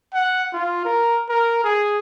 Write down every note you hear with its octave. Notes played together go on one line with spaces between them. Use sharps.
F#5
F4
A#4
A#4
G#4